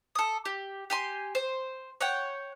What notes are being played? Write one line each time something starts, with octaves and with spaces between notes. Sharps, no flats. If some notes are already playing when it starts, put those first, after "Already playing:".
A4 D#6
G4
G4 G#5 C6
C5
C#5 F#5 G5